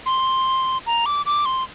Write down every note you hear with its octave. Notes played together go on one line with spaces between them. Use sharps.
C6
A#5
D6
D6
C6